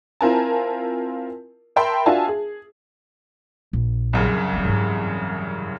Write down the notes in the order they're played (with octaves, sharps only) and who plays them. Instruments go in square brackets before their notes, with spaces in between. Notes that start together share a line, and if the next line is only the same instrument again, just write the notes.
[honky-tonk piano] C4 E4 F4 A#4 G#5 A5
A#4 E5 G5 A5 B5 C6
D4 F4 F#4 E5 G#5 A5
G#4
[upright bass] A#1
[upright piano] C2 F#2 C#3
[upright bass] F#3 C4
G#2 E3